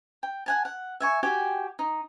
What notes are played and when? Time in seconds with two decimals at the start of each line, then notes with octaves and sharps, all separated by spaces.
0.23 G5
0.46 F#5 G#5 A5
0.65 F#5
1.00 E5 G#5 C#6
1.23 F#4 G4 G5 G#5
1.79 D#4